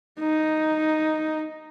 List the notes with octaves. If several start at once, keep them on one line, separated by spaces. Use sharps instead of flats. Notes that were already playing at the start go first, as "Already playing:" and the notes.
D#4